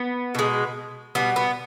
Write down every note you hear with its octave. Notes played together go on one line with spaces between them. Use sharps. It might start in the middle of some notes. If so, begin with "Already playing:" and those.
Already playing: B3
B2 G#3
B2 G3 B3
B3